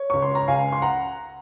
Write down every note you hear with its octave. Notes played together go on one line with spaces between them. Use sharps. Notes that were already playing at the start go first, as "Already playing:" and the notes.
Already playing: C#5
C#2 C#6
C6
A#5
C#2 F5 G#5
C6
F#5 A#5